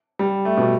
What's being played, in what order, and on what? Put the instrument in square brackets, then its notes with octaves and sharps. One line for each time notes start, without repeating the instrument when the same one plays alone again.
[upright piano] G3
A3
B2